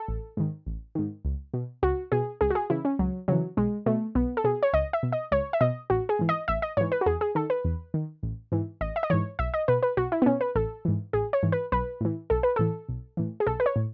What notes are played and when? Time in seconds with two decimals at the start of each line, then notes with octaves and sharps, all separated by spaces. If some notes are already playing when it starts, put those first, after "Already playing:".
Already playing: A4
0.08 A1
0.37 G#2 D#3
0.66 A1
0.95 G#2 D#3
1.25 C#2
1.54 B2
1.82 C#2 F#4
2.12 B2 G#4
2.41 C#2 G#4
2.50 F#4
2.55 G#4
2.70 C#3 E3 E4
2.85 C#4
2.99 C#2 F#3
3.28 C#3 E3 F#3
3.57 B1 G#3
3.86 B2 A3
4.15 B1 B3
4.37 A4
4.44 B2 G#4
4.63 C#5
4.73 C#2 D#5
4.93 E5
5.03 B2
5.12 D#5
5.31 C#2 C#5
5.53 E5
5.61 B2 D#5
5.90 A1 F#4
6.09 G#4
6.19 G#2 E3
6.29 D#5
6.48 A1 E5
6.62 D#5
6.77 G#2 E3 C#5
6.92 B4
7.01 F#4
7.06 E2 G#4
7.21 G#4
7.35 D#3 A4
7.50 B4
7.65 E2
7.94 D#3
8.23 A1
8.52 G#2 E3
8.81 A1 D#5
8.96 E5
9.03 D#5
9.10 G#2 E3 C#5
9.39 B1 E5
9.54 D#5
9.68 B2 B4
9.83 B4
9.97 B1 F#4
10.12 E4
10.22 B3
10.26 B2 C#4
10.41 B4
10.55 A1 A4
10.85 G#2 E3
11.13 A1 G#4
11.33 C#5
11.43 G#2 E3
11.52 B4
11.72 B1 B4
12.01 A2 E3
12.30 B1 A4
12.43 B4
12.56 A2 E3 A4
12.88 B1
13.17 A2 E3
13.40 G#4
13.47 B1 A4
13.60 B4
13.66 C#5
13.76 A2